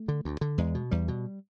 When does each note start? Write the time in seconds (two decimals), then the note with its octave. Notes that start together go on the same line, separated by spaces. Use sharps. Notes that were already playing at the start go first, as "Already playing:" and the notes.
Already playing: A3
0.08 D3
0.25 D2
0.41 D3
0.58 E2 G#3
0.75 B2
0.91 E2 G3
1.08 B2